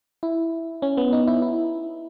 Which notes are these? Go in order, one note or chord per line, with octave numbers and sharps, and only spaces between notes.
E4
C#4
B3
D#4
E4
E4